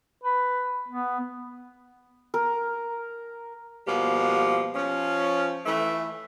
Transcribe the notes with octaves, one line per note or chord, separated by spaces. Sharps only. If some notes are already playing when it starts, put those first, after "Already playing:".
B4
B3
A#4
B2 F3 G3 A#3
F3 C#4
E3 A3